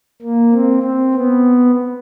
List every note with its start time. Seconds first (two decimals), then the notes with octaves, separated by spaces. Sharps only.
0.22 A#3
0.53 C4
0.83 C4
1.14 B3